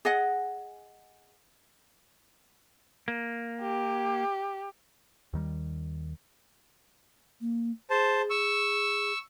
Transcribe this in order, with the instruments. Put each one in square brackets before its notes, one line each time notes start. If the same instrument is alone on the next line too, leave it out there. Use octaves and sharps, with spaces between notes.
[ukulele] G#4 D#5 F#5
[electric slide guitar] A#3
[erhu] G4
[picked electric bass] D#2 D#3 G3
[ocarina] A#3
[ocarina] G#4 [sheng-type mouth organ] C5 A5
[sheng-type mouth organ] C#6 E6